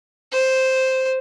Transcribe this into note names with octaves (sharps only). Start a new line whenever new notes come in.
C5